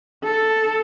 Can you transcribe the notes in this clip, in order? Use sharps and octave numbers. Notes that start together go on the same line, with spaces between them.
A4